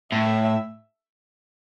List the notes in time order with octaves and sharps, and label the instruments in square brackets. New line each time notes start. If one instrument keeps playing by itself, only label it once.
[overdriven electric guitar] A2 [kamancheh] E5